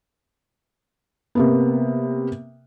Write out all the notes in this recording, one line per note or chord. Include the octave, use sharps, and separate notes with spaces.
C3 A#3 B3